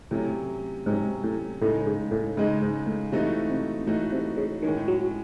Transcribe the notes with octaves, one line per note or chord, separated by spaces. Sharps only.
A2 C3 F#3 C#4
G#2 C3 F#3 C#4
A2
A2 C#3 G#3 D#4
G#2
A2
G#2 C#3 G#3 D#4
G#2
A2
C3 E3 A3 D#4 F#4
C3
A2 E3 A3 D#4 F#4
C3
C#3
A2 D#3 G#3 C#4
F#3